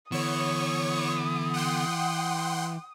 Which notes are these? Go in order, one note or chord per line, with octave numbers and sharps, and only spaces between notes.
D3 E3 B3 C#5 C#6 D#6
F#5 G5 C6